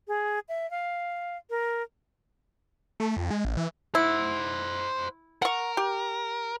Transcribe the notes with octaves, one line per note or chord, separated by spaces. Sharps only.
G#4
E5
F5
A#4
A3
F2
G#3
A1
E3
E4 C5 F#5
A#4 F#5 C#6
G4